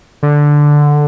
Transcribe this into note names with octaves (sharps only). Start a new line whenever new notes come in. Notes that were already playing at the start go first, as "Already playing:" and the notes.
D3